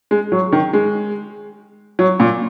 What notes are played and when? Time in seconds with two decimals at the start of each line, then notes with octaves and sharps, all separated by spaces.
0.11 G#3
0.32 F#3
0.52 D#3
0.73 G#3
1.99 F#3
2.20 A#2